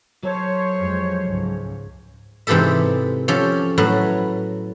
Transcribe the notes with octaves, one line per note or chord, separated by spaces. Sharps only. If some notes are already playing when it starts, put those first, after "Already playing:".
F#3 A4 C5 C#5
F2 G#3
C#2 G#2
G#2 C3 E3 G4 A4 E5
F3 C#4 G4 A4 C#5
A2 F#3 B4 A5